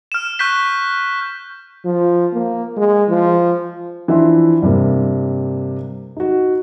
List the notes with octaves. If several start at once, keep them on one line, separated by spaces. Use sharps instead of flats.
F6 E7
C#6 F#6 G6 B6
F3
A#3
G#3
F3
E3 F3 D4 E5 C6
G2 C3 A#3
D#4 F#4